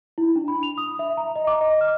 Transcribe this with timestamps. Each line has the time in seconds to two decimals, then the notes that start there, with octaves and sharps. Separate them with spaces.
0.18 E4
0.36 D4
0.48 B5
0.63 F7
0.78 D#6
0.99 E5
1.17 A#5
1.36 D#5
1.47 D6
1.61 D#5
1.81 F6